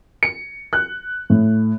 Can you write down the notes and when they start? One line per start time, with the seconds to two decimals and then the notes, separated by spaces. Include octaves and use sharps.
0.23 C#7
0.73 F#6
1.30 A2